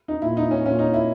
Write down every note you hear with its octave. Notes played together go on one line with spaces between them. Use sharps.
D#4
A#2 E4
D#4
C#4
A#2 C#4
D#4
E4